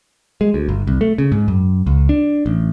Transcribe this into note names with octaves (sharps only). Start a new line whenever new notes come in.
G#3
D2
G1
C2
A3
C#3
G#2
F#2
C#2
D4
A1